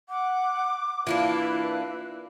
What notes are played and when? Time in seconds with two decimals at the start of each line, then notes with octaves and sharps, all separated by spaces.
0.09 F#5 D6
1.07 E3 A#3 D4 E4 F4 B4